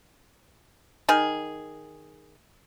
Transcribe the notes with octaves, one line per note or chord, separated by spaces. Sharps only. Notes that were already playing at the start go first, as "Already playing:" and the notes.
D#3 G#4